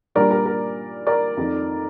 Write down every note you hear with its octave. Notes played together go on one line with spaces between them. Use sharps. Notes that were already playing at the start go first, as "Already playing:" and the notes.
A#2 G3 D4 A#4 D5
A#4
A#4
A#4 D5
F2 D#3 A3 D#4